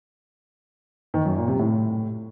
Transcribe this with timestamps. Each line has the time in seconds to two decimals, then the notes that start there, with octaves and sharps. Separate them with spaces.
1.14 D#3
1.25 F#2
1.37 A#2
1.48 C3
1.59 A2